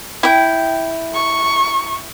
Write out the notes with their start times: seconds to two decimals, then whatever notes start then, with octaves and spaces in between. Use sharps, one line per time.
0.23 E4 G5
1.14 C#6